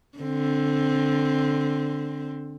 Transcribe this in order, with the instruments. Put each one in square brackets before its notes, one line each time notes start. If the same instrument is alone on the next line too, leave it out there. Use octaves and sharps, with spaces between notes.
[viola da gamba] D3 C4